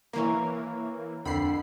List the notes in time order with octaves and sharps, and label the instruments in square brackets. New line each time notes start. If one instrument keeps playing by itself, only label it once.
[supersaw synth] E3 A#3 [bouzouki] A#4 B4 C#5
[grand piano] F2 D3 [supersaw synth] B5 C7